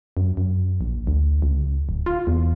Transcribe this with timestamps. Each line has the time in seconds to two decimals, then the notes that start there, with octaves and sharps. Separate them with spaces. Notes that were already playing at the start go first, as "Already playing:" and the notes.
0.17 F#2
0.37 F#2
0.81 A#1
1.07 D2
1.42 C#2
1.89 D1
2.06 F4
2.27 E2